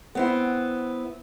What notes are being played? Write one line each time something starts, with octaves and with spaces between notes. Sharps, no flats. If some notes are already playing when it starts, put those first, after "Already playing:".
B3 C4 E4